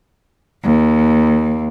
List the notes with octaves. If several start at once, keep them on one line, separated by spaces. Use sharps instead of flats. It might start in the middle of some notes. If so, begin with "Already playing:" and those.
D#2